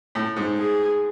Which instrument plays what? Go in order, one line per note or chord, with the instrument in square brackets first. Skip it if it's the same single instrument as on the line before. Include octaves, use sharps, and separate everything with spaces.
[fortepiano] A2
G#2
[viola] G#4